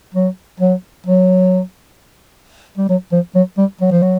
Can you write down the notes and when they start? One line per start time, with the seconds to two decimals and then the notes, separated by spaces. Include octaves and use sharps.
0.15 F#3
0.60 F#3
1.06 F#3
2.78 G3
2.89 F#3
3.12 F3
3.35 F#3
3.58 G3
3.81 F#3
3.91 F3
4.02 F#3